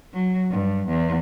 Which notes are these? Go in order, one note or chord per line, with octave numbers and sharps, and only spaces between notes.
F#3
G2
E2